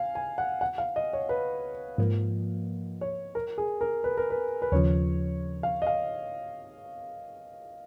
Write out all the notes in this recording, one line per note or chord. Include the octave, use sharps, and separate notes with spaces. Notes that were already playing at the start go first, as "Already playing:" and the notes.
Already playing: F5 G#5
G#5
F#5
F#5
F5
D#5
C#5
B4
G#2 F3 A#3
C#5
A#4
G#4
A#4
B4
A#4
B4
B4
D#2 C#3 F3 C#5
F5
D#5
F5